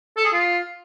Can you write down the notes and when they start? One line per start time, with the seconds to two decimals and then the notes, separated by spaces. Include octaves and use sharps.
0.17 A4
0.25 G#4
0.33 F4